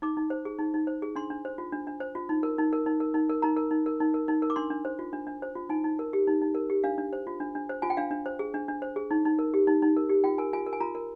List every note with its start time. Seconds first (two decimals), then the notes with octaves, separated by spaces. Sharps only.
0.02 D#4 D6
0.17 D#4
0.30 C5
0.45 G#4
0.59 D#4
0.74 D#4
0.87 C5
1.02 G#4
1.16 D4 C6
1.30 D4
1.45 C5
1.58 F4
1.72 D4
1.87 D4
2.00 C5
2.15 F4
2.29 D#4
2.43 A#4
2.58 D#4
2.73 A#4
2.86 D#4
3.00 A#4
3.14 D#4
3.29 A#4
3.42 D#4 A#5
3.57 A#4
3.71 D#4
3.86 A#4
4.00 D#4
4.14 A#4
4.28 D#4
4.42 A#4
4.50 D6
4.56 D4 C6
4.70 D4
4.85 C5
4.99 F4
5.13 D4
5.27 D4
5.42 C5
5.55 F4
5.69 D#4 G#5
5.84 D#4
5.99 A#4
6.13 G4
6.27 D#4
6.42 D#4
6.55 A#4
6.70 G4
6.84 D4 F5
6.98 D4
7.13 C5
7.27 F4
7.40 D4
7.55 D4
7.69 C5
7.82 F4 G#5
7.90 G5
7.97 D4 F5
8.11 D4
8.26 C5
8.39 G#4
8.54 D4
8.68 D4
8.82 C5
8.96 G#4
9.11 D#4
9.25 D#4
9.39 A#4
9.54 G4
9.67 D#4
9.82 D#4
9.96 A#4
10.10 G4
10.24 F4 G5
10.38 A#4 G#5
10.53 F4 G#5
10.66 A#4
10.73 G#5
10.80 F4 A#5
10.95 A#4